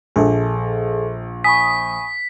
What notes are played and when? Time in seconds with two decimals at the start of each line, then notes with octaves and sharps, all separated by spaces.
0.16 A#1 G#4 A4
1.44 G#5 B5 C#6 D#6 B6